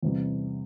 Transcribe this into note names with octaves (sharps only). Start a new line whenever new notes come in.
E2 C3 G3